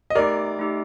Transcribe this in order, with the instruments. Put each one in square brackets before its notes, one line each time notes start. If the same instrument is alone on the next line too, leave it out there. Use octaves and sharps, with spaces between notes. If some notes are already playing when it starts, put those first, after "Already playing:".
[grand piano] D#5
[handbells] A3 D#4 G4 [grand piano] A#4 D5
[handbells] A3 D#4 G4